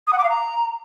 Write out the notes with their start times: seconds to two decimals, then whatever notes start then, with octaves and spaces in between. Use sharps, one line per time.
0.07 D#6
0.13 F#5
0.18 D6
0.24 F5
0.29 A#5